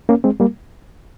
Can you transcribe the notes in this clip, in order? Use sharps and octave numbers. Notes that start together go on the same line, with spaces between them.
A#3 C#4
G#3 C4
G3 A#3